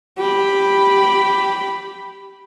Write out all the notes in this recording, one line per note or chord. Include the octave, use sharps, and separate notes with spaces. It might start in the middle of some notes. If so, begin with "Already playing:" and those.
G4 B5